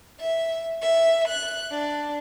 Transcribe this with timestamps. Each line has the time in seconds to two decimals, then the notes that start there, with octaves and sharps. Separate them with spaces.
0.21 E5
0.81 E5
1.28 F#6
1.71 D4